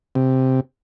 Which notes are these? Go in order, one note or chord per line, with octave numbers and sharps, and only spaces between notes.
C3